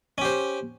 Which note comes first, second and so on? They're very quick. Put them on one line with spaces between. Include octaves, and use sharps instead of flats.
C#4 G4 C5